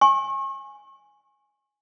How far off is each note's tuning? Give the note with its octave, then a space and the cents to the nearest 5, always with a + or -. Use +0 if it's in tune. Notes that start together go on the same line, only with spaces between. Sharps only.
G#5 +0 C#6 -40